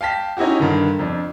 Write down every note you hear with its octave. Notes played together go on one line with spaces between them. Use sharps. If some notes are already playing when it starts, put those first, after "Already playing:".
F5 G5 A5 B6
C#4 D#4 E4 F#4 G4
G2 D3 D#3
F2 D4